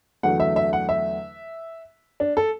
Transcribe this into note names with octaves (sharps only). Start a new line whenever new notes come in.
E2 D3 F#3 A3 F#5
E5
E5
F#5
E5
D4
A4